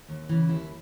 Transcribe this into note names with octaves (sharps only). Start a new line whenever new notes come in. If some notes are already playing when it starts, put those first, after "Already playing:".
D#2
C#3 E3
D#2 E4